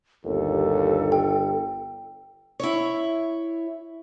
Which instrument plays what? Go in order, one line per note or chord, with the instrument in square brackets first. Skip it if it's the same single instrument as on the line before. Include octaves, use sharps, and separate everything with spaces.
[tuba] G1 [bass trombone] D#2 [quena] A4
[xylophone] G5
[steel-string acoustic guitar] E4 C#5